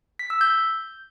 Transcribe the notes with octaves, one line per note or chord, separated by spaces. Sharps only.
B6
E6
G6